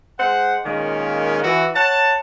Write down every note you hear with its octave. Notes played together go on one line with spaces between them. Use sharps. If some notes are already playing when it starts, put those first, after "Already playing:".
G#3 C5 F#5
A#2 D#3 G#3 A#3 C#4
E3 F#4
C#5 F#5 A5